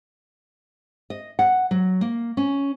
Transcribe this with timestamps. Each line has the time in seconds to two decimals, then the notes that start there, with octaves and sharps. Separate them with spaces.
1.10 D#5
1.39 F#5
1.71 F#3
2.01 A#3
2.37 C#4